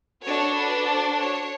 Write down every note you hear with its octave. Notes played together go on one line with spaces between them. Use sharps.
D4 F#4 A4 C#5
B4
C5
C#5